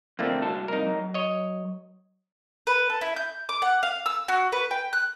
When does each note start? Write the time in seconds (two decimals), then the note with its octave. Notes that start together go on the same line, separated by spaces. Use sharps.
0.19 F2 D3 A3 A#3 C4
0.42 C2 F#4 A5
0.68 C2 F2 D#4 A#4
0.87 F#3
1.14 C#5 D#5
2.67 B4
2.90 A4
3.01 E4
3.16 G6
3.49 D6
3.62 F#5
3.83 F5
4.06 E6
4.28 F#4
4.52 B4
4.71 G5
4.93 F#6